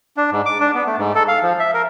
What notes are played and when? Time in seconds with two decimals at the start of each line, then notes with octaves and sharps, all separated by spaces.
0.17 D4
0.32 G#2
0.46 D6
0.60 D4
0.74 B3
0.86 A3
0.98 G#2
1.15 A4
1.28 F5
1.43 F3
1.60 E5
1.74 A#4